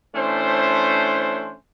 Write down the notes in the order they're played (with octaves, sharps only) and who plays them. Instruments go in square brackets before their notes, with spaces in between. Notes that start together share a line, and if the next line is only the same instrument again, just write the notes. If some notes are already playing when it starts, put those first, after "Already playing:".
[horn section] E3 A3 C#4 D4 C5